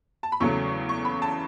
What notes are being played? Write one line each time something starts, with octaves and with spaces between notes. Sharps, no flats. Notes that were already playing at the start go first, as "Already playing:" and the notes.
A5
B5
E2 C#3 F#3 A3 C#6
C#6
B5
A5